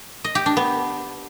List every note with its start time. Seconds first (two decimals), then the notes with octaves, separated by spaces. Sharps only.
0.24 D#5
0.35 G4
0.46 D4
0.57 B3